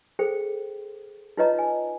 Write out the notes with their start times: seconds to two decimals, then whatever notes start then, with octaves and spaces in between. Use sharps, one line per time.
0.19 G#4 A4 C5 G5
1.37 D#4 F4 B4 C#5 D#5 A#5
1.59 G#5